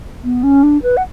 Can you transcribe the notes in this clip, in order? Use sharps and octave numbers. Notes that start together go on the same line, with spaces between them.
B3
C#4
D4
B4
F#5